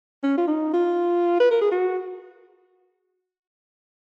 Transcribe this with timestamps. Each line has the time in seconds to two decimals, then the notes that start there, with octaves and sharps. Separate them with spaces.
0.23 C#4
0.38 F4
0.48 D#4
0.74 F4
1.40 B4
1.51 A#4
1.61 G#4
1.72 F#4